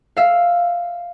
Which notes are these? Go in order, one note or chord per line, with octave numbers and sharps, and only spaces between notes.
E5 F5